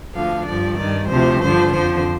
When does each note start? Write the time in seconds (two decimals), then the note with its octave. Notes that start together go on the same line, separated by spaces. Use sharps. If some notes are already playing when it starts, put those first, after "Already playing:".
0.14 D2 D3 F3 F5
0.46 G2 F3 D5
0.78 G2 D#3 D5
1.09 D2 C3 F3 C5
1.41 G2 D3 F3 C5
1.73 F2 D3 F3 C5